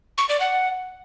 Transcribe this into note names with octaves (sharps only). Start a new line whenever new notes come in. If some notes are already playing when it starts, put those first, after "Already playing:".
C#6
D5
F#5